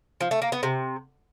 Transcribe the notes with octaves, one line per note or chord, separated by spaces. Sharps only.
F3
A3
A#3
B3
C3